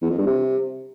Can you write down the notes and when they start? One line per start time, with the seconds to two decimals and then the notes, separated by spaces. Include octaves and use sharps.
0.02 E2
0.10 F2
0.18 G2
0.26 C3